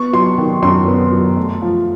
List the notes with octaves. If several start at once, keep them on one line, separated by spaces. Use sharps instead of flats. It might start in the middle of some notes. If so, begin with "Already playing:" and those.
Already playing: B3 C#6
F#3 C6
D#3
F#2 C6
B3
F#3
A3
F3